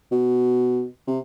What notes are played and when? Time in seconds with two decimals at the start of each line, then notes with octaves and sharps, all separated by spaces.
0.12 B2
1.07 C3